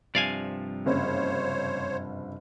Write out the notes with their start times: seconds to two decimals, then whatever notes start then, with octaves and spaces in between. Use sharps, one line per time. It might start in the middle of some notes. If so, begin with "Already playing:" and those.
0.15 G2 C3 F3 D5 F5 G#5
0.86 F#1 C5 C#5